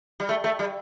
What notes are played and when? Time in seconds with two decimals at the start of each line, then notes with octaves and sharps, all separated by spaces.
0.20 G3
0.29 A3
0.44 A3
0.59 G3